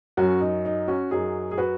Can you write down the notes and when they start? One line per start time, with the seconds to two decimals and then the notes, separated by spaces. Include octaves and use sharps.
0.17 F#2 F#3 C#4 F#4
0.41 D#4
0.65 D#4
0.88 C#4 F#4
1.11 F#2 F#3 D#4 G#4
1.52 G#4
1.58 F#4 B4